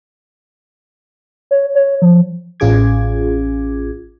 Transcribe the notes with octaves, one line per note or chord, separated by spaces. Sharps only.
C#5
C#5
F3
A1 C#4 F4 G#4 D6 G#6